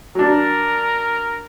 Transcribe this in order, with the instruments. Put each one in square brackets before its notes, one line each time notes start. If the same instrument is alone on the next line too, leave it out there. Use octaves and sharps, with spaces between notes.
[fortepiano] F#3 D4 [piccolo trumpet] A#4